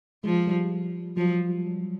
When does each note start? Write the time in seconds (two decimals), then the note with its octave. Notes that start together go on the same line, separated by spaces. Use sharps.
0.24 F3 G#3
0.47 G3
1.17 F3 F#3